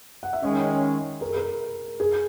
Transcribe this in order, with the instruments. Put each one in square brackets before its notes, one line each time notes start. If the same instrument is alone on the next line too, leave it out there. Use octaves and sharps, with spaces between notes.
[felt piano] F#5
E5
[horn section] D#3 G#3 C#4 [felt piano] D#5
[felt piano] A#4
G#4
A#4
G#4